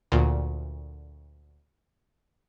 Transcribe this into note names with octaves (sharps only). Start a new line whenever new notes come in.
D2 A#2